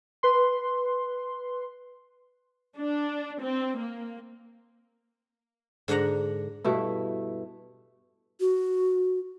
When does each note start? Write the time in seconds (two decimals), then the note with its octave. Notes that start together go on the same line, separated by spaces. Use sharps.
0.23 B4 C6
2.77 D4
3.41 C4
3.78 A#3
5.88 G#2 D3 D4 F#5 A#5
6.64 G2 B2 A3 E4
8.40 F#4